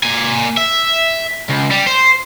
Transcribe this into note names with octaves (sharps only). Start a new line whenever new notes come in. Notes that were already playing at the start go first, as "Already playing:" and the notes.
A#3 G#5
E5
C#2
G3
C5